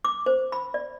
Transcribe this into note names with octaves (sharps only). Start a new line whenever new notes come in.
D6
C5
B5
D5